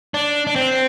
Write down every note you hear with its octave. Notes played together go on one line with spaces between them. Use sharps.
D4
D4
C4